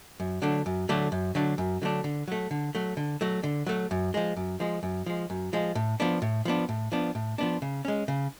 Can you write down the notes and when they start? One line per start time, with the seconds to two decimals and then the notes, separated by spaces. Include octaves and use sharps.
0.20 F#2
0.42 D3 F#3 A3 D4
0.66 F#2
0.89 D3 F#3 A3 D4
1.12 F#2
1.35 D3 F#3 A3 D4
1.58 F#2
1.82 D3 F#3 A3 D4
2.04 D3
2.28 F#3 A3
2.51 D3
2.75 F#3 A3
2.97 D3
3.21 F#3 A3
3.44 D3
3.67 F#3 A3
3.91 F#2
4.14 F3 G#3
4.37 F#2
4.60 F3 G#3
4.83 F#2
5.06 F3 G#3
5.30 F#2
5.53 F3 G#3
5.75 A2
6.00 F3 B3 D4
6.22 A2
6.45 F3 B3 D4
6.69 A2
6.92 F3 B3 D4
7.15 A2
7.38 F3 B3 D4
7.62 C#3
7.85 G#3 C#4
8.08 C#3